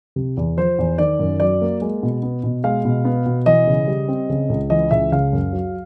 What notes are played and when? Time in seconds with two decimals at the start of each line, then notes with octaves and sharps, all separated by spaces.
0.16 C3
0.37 E2
0.57 F3 C5
0.79 E2
0.98 D#3 D5
1.19 F#2
1.40 F#3 D5
1.61 A#3
1.82 G#3
2.03 B2
2.23 B3
2.44 B2
2.64 G#3 F5
2.85 B2
3.05 B3
3.26 B2
3.46 E3 D#5
3.67 C#3
3.88 G3
4.08 C4
4.30 C#3
4.50 C#2
4.70 E3 D#5
4.91 C#2 E5
5.12 C#3 F5
5.33 F#2
5.53 F#3